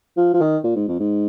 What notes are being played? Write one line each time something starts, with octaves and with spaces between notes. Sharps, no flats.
F3
F3
D#3
A#2
G#2
F2
G#2